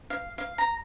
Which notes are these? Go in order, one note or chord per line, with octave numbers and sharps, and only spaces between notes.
F5
F5
A#5